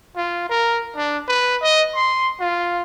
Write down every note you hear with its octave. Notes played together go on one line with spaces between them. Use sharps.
F4
A#4
D4
B4
D#5
C6
F4